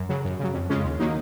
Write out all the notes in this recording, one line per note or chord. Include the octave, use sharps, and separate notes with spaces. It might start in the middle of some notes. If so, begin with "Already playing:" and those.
Already playing: F#2
C#3 F#3
F#2
C#3 F#3
F2
C#3 G#3 C#4 F4
D#2
D#3 F#3 A#3 D#4